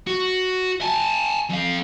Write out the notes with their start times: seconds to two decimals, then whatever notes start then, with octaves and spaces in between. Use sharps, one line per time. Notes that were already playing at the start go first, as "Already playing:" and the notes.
0.07 F#4
0.82 G#5 A5
1.49 F2 F5